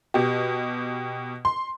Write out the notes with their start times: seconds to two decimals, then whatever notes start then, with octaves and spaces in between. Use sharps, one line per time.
0.14 B2 G4
1.45 C6